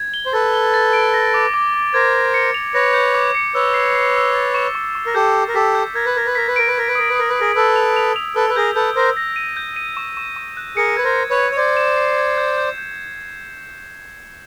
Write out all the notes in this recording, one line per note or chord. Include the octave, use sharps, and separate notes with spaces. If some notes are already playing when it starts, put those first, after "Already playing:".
Already playing: G#6
G7
C5
A4 B4 A6
G7
A6
D7
A#6
D6
D6
D6
A#4 C5 G#6
G#6
C#7
F7
B4 C#5 A#6
G6
D6
C#7
B4 C#5 E6
C7
C7
E6
A6
C#6
C#6
C#6
A#4
G4 A4 G6
G6
A#4
G4 A4 B6
G6
A#4 G#6
B4
A#4 G#6
B4
A#4 B6
B4
A#4 D7
B4
A#4 G#6
B4
A#4 D#6
B4
A#4 D#6
B4
G#4 A#4 D#6
A4 B4 E6
F7
F7
F7
A4 B4 E6
B4
G#4 A#4 G6
A4 B4 G6
A#4 C5 G6
A#6
D#7
G6
D#7
C#6
C#6
C#6
F#6
G#4 A#4 C#7
B4 G#6
A#4 C5
C#7
B4 C#5
G#6
C#5
C5 D5 G#6
E7
C7
G#6
G6
G6
G6